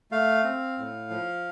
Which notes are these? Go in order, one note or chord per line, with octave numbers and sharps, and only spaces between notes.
A3 F5
C4
A2
F3